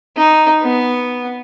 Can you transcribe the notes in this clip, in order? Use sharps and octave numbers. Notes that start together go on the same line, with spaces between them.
D#4
B3